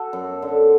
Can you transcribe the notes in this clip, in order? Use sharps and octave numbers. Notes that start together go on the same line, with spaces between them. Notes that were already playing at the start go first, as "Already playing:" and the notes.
Already playing: F#4 A4
F#2
D3